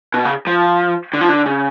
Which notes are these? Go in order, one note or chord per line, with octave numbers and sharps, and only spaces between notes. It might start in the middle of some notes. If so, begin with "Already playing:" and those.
B2
C#3
F3
D3
F3
D3
C#3